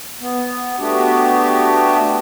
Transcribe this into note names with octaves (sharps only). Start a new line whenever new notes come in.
B3
A3 B3 D4 F#4 G4